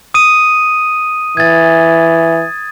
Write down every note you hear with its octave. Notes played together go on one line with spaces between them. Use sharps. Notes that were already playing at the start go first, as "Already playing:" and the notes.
D#6 D#7
E3 G#6 A6